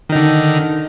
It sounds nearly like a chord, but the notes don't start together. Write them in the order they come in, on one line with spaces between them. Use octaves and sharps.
D#3 D#4 D3